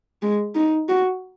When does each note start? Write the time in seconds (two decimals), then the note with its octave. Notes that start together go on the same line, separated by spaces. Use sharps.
0.22 G#3
0.55 D#4
0.89 F#4